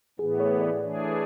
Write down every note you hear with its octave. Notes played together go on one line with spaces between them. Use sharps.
A2 E3 B3 G#4
C#5
D5
E3 A3 D4 G#4